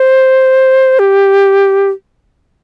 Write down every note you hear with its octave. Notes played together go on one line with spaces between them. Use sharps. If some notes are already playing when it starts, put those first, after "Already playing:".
Already playing: C5
G4